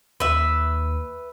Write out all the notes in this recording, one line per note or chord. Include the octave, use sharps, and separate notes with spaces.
D#2 B4 E5